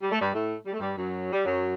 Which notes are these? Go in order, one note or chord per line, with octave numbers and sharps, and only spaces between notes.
G3
A3
G2 G3
A2 A3
G3
A3
G2 G3
F#2 F#3
G3
F#2 F#3